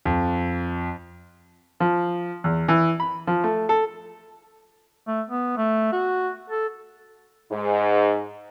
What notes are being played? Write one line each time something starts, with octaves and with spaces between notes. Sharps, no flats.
F2
F3
E2
E3
B5
F3
A3
A4
A3
B3
A3
F#4
A4
G#2